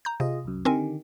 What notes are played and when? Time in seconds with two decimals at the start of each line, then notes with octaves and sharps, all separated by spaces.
0.05 A#5 G6
0.20 C3 F4 G#4 D#5
0.45 C2 F#2
0.65 D3 D#3 C4 G4 A#4 G#5